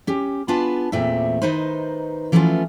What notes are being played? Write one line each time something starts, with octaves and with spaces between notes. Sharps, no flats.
C#4 G4
B3 D4 F4 G#4 B4 A5
E2 A#2 A3 C4 E5
D#3 D#4 B4 C5
E3 F3 A3 B3 C#4 F4